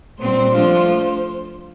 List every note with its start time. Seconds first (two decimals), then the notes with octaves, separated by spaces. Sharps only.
0.19 A#2 G3 C4 C5
0.52 F3 A3 D4 F4